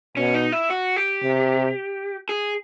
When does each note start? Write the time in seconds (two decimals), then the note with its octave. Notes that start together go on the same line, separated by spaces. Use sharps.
0.17 B2 C#4
0.34 D#4
0.52 E4
0.70 F#4
0.96 G4
1.23 C3
2.29 G#4